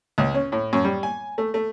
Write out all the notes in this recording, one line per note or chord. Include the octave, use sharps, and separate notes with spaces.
C#2
C#4
A2
F#2
G3
G#5
A3
A3